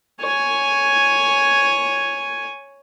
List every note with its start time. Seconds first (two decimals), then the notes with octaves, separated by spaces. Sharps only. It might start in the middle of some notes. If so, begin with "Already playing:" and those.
0.21 C#5 G#5